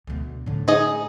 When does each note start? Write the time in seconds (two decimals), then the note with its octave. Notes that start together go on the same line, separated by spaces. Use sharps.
0.07 D2 B2
0.46 A2 D3
0.68 D#4 G#4 D#5